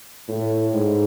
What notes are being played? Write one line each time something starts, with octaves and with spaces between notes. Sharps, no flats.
A2
G#2